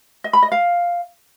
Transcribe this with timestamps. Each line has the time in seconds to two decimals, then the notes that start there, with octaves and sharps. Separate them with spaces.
0.24 D#5
0.33 B5
0.42 D#5
0.52 F5